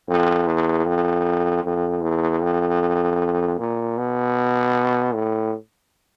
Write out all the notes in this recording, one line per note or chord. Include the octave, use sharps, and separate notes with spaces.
F2
E2
F2
F2
E2
F2
A#2
B2
A2